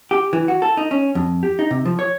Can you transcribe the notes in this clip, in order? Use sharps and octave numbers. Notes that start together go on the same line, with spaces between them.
G4
E3
F#4
A4
D#4
C#4
F2
G4
D#4
C3
F3
C#5